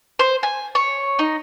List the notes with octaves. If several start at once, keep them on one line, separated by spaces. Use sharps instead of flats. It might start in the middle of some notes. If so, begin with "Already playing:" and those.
C5
G#5
C#5
D#4